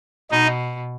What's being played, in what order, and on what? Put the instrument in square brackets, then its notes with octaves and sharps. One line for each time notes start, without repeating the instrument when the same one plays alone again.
[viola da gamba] B2 [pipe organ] D#4